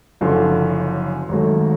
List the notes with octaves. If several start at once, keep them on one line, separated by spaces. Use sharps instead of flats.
F#1 F#2 D3 F3
G#1 G#2 F#3 A3